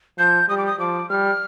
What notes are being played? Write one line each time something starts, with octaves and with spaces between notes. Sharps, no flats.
F3 G6
G3 D#6
D6
D#6
F3 D6
G3 F6